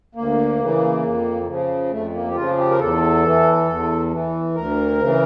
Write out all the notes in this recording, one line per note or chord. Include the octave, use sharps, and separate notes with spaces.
D2 A#3
C#3 E3
F2
C#3 F3
F2 A3
A#3
G4
C#3 F3 F4
G4
A#4
E2 A4
E3
E2
E3
D2 A#4
C#3 E3